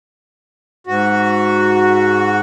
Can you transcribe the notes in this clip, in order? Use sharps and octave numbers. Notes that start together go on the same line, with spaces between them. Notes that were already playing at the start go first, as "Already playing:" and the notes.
G#2 F#4